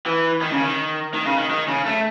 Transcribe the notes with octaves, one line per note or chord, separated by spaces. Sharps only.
E3
D#3
C#3
D#3
D#3
C#3
D#3
D#3
C#3
A3